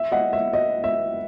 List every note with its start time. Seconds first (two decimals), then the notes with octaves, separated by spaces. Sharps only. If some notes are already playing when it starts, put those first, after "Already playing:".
Already playing: E5
0.12 D#5 F#5
0.33 E5
0.53 D#5
0.84 E5